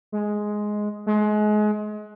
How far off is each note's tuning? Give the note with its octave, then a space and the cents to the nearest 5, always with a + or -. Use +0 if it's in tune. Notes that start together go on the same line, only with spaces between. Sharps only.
G#3 +5
G#3 +30